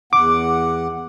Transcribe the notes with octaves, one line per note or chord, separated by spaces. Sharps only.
E2 F#5 D6